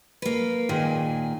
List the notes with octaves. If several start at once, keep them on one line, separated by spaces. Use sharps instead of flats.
A#3 B4
A#2 D#3 G#4